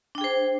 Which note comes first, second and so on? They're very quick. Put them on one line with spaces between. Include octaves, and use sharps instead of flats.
D4 G5 G#4 C5